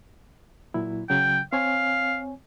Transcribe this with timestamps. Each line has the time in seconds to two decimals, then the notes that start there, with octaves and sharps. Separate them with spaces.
0.74 A#2 F#3 E4
1.10 C#3 F#3 G5
1.53 C4 C#5 F5 G#5